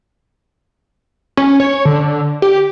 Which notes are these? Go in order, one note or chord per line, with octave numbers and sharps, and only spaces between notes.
C#4
C#5
D3
G4